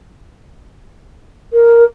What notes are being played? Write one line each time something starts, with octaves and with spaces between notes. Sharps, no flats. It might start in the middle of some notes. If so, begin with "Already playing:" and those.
A#4